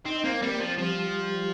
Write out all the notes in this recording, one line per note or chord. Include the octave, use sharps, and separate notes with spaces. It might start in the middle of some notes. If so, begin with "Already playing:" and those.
C4 D#4
A#3 C4
G3 A#3
F3 C4
F3 G3